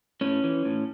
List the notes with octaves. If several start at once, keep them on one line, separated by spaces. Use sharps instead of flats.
A2 C#4
E3
A2